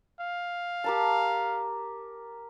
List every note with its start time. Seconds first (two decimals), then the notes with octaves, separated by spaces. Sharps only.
0.20 F5
0.84 G4 A#4 A5